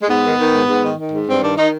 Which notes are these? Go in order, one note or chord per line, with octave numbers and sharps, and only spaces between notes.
G#3
G#2 B3
D#3
D#3
G#2
G#2
D#3
D#3
G#2
G2 C4
D#3 D4
D#3 D#4